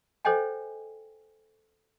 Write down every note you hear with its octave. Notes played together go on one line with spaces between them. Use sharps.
A4 C5 C#5 D#5 G5 G#5